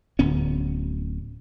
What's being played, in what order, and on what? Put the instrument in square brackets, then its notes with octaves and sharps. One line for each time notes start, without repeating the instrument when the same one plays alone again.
[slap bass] D1 D2 B3 C#4